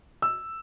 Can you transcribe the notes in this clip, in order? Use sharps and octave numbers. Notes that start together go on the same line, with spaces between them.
E6